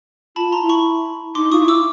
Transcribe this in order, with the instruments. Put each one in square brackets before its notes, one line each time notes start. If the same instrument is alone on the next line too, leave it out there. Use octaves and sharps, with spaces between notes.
[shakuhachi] F4 [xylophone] A5 B5
[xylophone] A#5 C6
[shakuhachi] E4
[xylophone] B5 C#6
[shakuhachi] D#4 [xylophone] C6 D6
[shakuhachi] F4 [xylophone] C#6 D#6
[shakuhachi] E4
[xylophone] D6 E6